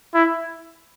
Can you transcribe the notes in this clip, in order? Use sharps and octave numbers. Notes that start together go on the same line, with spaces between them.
E4